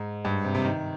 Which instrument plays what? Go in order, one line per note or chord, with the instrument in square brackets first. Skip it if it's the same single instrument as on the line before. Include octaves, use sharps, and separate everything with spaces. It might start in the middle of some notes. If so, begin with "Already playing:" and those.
Already playing: [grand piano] G#2
G2
C3
C3
D#3